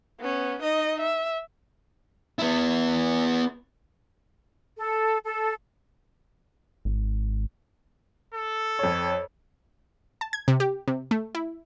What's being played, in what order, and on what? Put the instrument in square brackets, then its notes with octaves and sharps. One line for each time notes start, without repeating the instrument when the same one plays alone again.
[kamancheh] B3 C#4
D#4 D#5
E5
[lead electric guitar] B3 E4
[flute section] A4
A4
[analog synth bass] G#1
[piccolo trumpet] A4
[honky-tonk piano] F2 C#5
[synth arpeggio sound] A5
G#6
C3
G4
C3
A3
E4